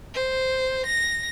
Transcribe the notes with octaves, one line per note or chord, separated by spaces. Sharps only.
C5
A#6